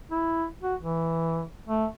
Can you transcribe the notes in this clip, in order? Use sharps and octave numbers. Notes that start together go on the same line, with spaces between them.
E4
F#4
E3
A3